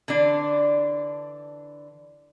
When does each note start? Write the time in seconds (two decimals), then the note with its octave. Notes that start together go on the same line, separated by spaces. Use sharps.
0.08 D3 E3 D4